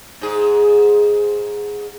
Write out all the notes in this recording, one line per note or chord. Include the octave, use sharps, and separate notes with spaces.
G#2 G#4